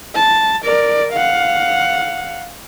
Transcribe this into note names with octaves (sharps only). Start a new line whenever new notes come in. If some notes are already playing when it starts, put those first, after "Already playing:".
A5
A#4 D5
F5 F#5